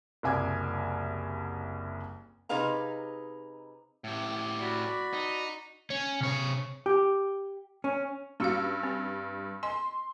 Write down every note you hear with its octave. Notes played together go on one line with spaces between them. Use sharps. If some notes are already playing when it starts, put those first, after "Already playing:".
F#1 C2 G#5 D6 G#6
C3 D#4 G#4 B4 F5 A#5
A2 G4
F#4 D5 B5
D#4
C#4
C3 C#5
G4
C#4
G2 C#4 F#4 F5 E6
C4
D#5 G#5 C6